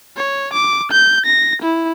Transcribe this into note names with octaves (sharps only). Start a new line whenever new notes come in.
C#5
D6
G6
A#6
E4